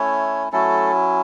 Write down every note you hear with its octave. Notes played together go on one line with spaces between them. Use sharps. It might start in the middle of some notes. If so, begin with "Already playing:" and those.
Already playing: A3 C#4 E4 C#5
F#3 A3 C#4 E4 A4